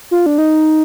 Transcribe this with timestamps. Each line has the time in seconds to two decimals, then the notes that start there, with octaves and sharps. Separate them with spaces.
0.11 F4
0.26 D4
0.38 D#4